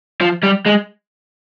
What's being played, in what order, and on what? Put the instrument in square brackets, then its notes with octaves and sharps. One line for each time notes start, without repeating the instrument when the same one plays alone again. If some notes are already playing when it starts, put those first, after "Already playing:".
[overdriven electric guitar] F3
G3
G#3